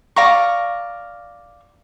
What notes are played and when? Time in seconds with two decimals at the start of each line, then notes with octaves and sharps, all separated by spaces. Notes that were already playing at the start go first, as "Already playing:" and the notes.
0.16 D5 F5 A#5 C#6